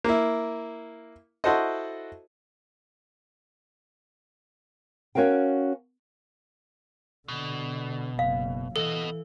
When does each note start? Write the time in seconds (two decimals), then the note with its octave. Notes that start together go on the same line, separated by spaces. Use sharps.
0.04 A#3 E4
1.44 E4 F#4 A4 C5 D#5
5.15 C#4 F#4 A#4 F5 G5
7.28 B2 D3
8.19 F#1 F5
8.76 E3 B3 A4 D#5